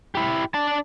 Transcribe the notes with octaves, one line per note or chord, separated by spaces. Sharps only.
E4 G4
D4 A5